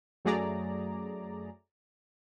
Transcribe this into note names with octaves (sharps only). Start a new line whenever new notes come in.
F#2 F#3 A3 G#4 D5 A#5